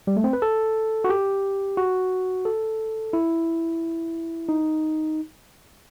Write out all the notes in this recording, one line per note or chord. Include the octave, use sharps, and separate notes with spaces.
G3
A3
C4
B4
A4
F#4
G4
F#4
A4
E4
D#4